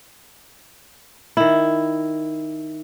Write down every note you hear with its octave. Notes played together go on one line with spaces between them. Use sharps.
D#3 E4